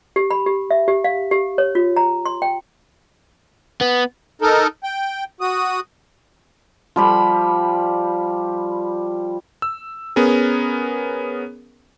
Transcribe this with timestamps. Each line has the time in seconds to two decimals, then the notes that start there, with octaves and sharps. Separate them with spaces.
0.16 G4
0.31 B5
0.46 G4
0.71 E5
0.88 G4
1.04 F5
1.31 G4
1.58 C#5
1.75 F4
1.97 A#5
2.26 C6
2.42 G5
3.81 B3
4.42 D#4 A4 A#4
4.84 G5
5.41 F#4 D#6
6.96 F3 G3 B5
9.62 E6
10.16 B3 C#4 G#4 A#4